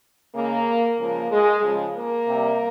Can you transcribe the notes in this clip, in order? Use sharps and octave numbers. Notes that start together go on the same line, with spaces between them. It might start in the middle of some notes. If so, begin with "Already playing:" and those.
C#3 G#3 A#3
C#3 F3 G#3 A#3
G#3
C#3 F3 G#3
A#3
C3 G3